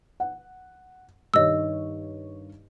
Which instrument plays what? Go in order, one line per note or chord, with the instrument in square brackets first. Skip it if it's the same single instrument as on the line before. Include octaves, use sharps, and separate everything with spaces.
[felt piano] F#5
[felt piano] G2 D#3 C#5 [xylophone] D#5 E6